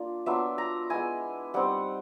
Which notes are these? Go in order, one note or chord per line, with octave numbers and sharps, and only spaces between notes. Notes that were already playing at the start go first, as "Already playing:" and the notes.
Already playing: A#3 D4 F4
F#3 B3 D4 F4 E5
A#5
G#3 B3 E4 G#5
G3 C4 D#4 F#5